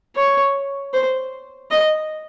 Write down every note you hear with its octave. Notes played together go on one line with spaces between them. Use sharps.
C#5
C5
D#5